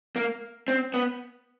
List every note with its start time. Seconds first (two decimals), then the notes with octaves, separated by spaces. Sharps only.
0.16 A#3
0.68 C4
0.94 B3